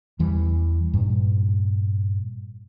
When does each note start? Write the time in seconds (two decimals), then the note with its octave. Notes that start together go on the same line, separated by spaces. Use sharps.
0.19 E2 E3 G3
0.94 G2 A#2